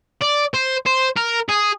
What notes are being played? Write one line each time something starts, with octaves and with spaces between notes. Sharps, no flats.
D5
C5
C5
A#4
G#4